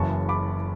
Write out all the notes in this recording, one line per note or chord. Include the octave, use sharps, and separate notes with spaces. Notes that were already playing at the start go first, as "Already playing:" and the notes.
Already playing: F#1 F#2 C#3 E3 A5 C#6
B5 D6